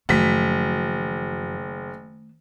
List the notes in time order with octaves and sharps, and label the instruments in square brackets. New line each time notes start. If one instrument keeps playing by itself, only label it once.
[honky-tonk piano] F#1 B6 [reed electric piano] F#2 F3 F#4 [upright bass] D#3 A3